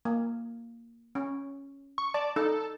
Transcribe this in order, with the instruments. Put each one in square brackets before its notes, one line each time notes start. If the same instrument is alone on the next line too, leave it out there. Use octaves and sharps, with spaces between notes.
[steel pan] A#3
C#4
[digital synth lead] C#6
[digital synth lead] D5 [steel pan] A5
[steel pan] D#4 [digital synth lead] A4